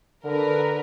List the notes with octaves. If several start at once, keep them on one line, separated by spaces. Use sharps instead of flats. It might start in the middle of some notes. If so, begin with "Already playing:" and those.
D3 A#4 B4